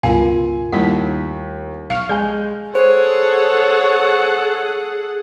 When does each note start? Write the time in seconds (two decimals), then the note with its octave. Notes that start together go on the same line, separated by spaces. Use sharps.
0.03 C#2 G2 B2 F4 A#4 F5 G#5 C6
0.72 D#2 G3 A3 D#4 E4 F#5 B6
1.90 B1 F5 C#6 F6
2.09 G#3 G#5 G6
2.75 G#4 A4 C5 C#5 F#5